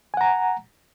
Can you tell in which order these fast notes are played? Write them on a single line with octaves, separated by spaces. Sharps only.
G#5 F#5 A#5